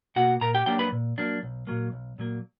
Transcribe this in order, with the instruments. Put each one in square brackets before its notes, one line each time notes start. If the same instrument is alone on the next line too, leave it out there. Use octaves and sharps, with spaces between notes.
[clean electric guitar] B2 A#3 F#4 F#5
A#2 A#4 A#5
G4 G5
F#3 A#3 D4 G4 G5
B4 B5
A#2
F#3 A#3 D4
B1
A#2 F#3 A#3
B1
A#2 F#3 A#3